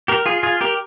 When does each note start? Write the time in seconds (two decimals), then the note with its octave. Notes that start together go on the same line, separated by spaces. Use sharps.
0.08 G4 A#4
0.26 F4 G#4
0.43 F4 G#4
0.61 G4 A#4